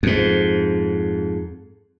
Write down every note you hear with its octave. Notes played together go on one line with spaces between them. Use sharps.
F2 G#2